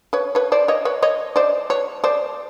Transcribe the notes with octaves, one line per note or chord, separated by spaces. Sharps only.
B4 C#5
B4 C#5
C5 D5
C#5 D#5
B4 C#5
C#5 D#5
C5 D5
B4 C#5
C5 D5